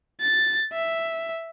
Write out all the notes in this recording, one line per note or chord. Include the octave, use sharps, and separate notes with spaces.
A6
E5